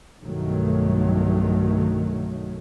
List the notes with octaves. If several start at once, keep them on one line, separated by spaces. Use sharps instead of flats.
B1 G2 D#3 F#3 A3